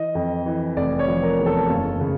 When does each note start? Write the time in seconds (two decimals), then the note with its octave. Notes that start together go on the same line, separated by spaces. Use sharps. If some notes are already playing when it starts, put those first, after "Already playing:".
Already playing: E3 D#5
0.15 F2
0.46 E3
0.77 F1 D5
0.99 C#5
1.08 F3
1.23 A#4
1.39 E2
1.46 A4
1.69 F#1 F4
2.01 C#3